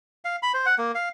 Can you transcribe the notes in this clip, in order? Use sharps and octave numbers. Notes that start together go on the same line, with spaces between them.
F5
B5
C5
F#5
A#3
F5